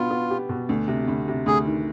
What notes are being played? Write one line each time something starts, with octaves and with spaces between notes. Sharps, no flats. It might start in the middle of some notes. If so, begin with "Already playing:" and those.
Already playing: B2 B3 D4 F4
B3
G4
B2
D2
C3
D2
C3
D2 G#4
D#3